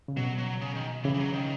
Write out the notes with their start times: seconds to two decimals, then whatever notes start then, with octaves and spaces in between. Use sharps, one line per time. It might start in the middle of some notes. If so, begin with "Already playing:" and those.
0.08 C#3
0.17 B2 F#3
0.38 F#3
0.61 C#3
0.75 D#3
1.04 C#3 E3
1.14 E3
1.19 F#3
1.33 D#3